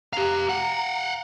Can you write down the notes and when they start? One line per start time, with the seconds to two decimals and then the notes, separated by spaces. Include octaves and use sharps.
0.13 G4 F5 A#5
0.49 F5 F#5